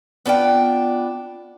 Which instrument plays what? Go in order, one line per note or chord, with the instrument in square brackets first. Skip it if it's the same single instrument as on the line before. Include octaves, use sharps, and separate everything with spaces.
[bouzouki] B3 D4 F4 G5